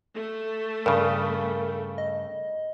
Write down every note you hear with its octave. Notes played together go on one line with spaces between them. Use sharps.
A3
G2 C#3 A#4
D#5